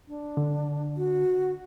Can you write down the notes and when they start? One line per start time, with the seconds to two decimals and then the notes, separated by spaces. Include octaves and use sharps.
0.08 D4
0.37 D3
0.97 F#4